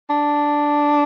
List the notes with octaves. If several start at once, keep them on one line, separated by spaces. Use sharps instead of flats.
D4